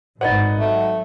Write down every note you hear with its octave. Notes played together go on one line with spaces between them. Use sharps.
G#1 A2 D#4 B4 C5 D5 D#5 F#5
F#3 A3